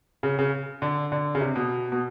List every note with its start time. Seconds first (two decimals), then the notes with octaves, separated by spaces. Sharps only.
0.23 C#3
0.39 C#3
0.82 D3
1.12 D3
1.35 C#3
1.41 C3
1.56 B2
1.92 B2